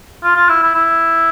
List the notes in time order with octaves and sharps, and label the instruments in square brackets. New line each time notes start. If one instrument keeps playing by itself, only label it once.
[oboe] F4
F4
E4
E4
E4